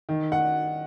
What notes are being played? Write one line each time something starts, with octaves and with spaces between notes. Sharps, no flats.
D#3
F#5